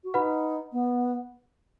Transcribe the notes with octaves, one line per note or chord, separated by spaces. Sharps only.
F#4
D#4 B4 F#5 B5
B3